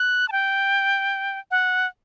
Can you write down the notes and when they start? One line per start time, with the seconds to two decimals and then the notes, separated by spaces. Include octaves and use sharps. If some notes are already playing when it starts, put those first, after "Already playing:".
Already playing: F#6
0.28 A5
0.32 G5
1.51 F#5